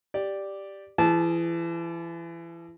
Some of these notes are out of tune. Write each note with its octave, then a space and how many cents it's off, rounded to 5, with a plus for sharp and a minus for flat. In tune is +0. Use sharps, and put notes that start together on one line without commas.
G4 +0 D5 +0
E3 +30 G#4 +0 A5 -20